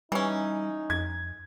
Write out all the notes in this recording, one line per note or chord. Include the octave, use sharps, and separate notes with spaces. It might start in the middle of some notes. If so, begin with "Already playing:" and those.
E3 G3 C#4 D#4
F2 G#6